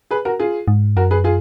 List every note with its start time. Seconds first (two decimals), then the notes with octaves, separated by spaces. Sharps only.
0.11 G#4 B4
0.25 F#4 A#4
0.40 F4 G#4
0.68 G#2
0.96 F#2 F#4 A#4
1.11 G#4 B4
1.24 F4 G#4